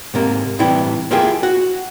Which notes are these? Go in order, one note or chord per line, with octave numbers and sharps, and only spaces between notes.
G#2 C3 A#3
A2 C3 E3 G3 E4 G4
A#3 E4 F4 G4 G#4
F#4